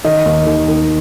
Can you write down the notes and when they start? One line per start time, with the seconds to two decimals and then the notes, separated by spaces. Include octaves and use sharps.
0.04 D#3 D#5
0.25 D#2
0.47 D#3
0.68 D#3